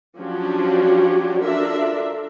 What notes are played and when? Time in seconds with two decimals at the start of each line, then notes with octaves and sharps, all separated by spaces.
0.19 F3 F#3 C#4 D4 F#4 G4
1.44 D4 F4 A4 A#4 E5